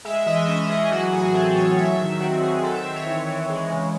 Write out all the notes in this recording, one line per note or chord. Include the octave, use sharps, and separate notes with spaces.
G#3 E5
E3 D#5
C#4 D#5
E3 G#4
F#3 F#4
A2 G#4
C4 A4
A2 C#5
F#3 E5
D#3 E5
C4 F#4
D#3 G#4
C4 A4
E5
C4 E5
C#5
E3
E3
G#3
C#3